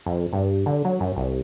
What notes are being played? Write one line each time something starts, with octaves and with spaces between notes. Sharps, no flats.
F2
G2
D3
F#3
F#2
C2